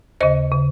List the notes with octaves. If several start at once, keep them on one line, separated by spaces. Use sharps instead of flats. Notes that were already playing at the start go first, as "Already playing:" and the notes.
D#2 C#3 C5 D#5
C#3